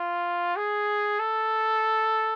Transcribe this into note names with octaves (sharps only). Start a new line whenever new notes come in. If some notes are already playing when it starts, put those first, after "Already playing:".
Already playing: F4
G#4
A4